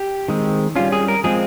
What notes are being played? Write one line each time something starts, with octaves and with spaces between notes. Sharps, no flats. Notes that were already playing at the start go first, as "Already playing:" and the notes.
Already playing: G4
D#3 G#3 C4
G3 C#4 F4
G#4
A#4
F3 G#3 C4 G#4